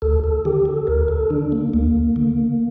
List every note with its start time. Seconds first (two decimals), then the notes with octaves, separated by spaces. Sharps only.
0.02 D2 A4
0.24 A4
0.45 D3 G4
0.65 A4
0.87 D2 A#4
1.08 A4
1.30 D3 D4
1.52 A#3
1.73 D2 A#3
2.16 D3